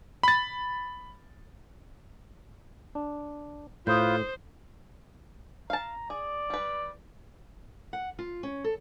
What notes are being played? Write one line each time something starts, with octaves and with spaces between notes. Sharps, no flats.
B5 A6
D4
A2 F4 B4 C5 D#6 G6
F5 A5 A#5
G#4 D5
G3 B4
F#5
F4
C#4
A4